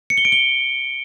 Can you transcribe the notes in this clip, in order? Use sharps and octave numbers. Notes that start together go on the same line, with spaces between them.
C#7
G7
D7
G7